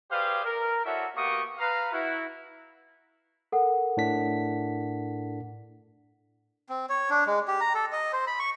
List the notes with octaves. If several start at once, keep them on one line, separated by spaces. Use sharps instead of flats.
G4 G#4 B4 C5 D5 F5
A#4
E4 F#4 A4 C#5 D5 E5
A#3 B3 F#4 G4 C#6 D#6
B4 F5 A#5
E4 F#4
A4 A#4 F#5
A2 D4 B6
C4
C#5
D4
G#3
G4
A#5
A4
D#5
C5
B5
C#6